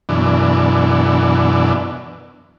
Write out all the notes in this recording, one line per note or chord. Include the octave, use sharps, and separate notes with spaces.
F#2 B2 E3 D4